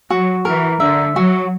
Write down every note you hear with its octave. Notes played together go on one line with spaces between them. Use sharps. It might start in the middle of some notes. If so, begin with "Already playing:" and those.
F#3 F#4
E3 A#4
D3 E5
F#3 F#4